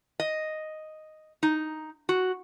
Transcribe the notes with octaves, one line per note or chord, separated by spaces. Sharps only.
D#5
D#4
F#4